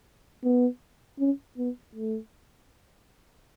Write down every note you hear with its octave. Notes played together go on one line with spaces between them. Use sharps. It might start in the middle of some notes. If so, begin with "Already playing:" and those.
B3
C#4
B3
A3